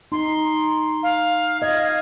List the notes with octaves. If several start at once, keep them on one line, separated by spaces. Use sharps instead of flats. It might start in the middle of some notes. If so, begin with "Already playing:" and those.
D#4 C6
F5
D#5 F5 G#6